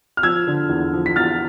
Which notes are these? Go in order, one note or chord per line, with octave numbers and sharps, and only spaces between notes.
F6
F3 E6 G#6
D3
E2
F3
B6
E2 F6 A6